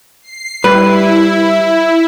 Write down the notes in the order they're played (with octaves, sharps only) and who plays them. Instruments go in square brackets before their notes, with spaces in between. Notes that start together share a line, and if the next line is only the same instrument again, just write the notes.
[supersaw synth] C7
[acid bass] G3 [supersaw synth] E4 [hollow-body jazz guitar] B4